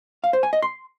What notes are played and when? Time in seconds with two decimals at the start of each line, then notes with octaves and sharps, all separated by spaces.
0.24 F5
0.33 C5
0.43 G#5
0.53 D#5
0.62 C6